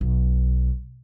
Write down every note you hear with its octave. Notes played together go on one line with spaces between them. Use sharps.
B1